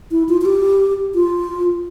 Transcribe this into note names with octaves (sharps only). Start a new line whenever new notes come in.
E4
F4
F4
G4
F4